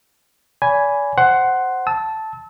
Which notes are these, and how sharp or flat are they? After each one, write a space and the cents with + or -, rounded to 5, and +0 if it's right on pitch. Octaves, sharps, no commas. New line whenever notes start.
D5 -40 G#5 +0 B5 +0
C5 +0 F#5 +10 C6 +0
A5 -5 E6 -35